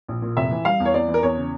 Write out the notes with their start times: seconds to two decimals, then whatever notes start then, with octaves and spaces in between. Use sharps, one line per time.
0.08 A#1
0.22 A#2
0.37 F1 E5
0.51 E3
0.65 G3 F5
0.80 E2
0.85 C#5
0.94 E2 D5
1.08 E3
1.14 A#4
1.23 E2 C#5
1.37 C#3